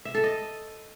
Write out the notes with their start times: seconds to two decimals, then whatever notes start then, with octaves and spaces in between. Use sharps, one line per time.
0.05 E5
0.15 A4
0.24 D#5